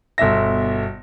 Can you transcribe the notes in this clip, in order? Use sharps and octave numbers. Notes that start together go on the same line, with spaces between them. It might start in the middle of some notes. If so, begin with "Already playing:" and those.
G1 B2 E5 A#6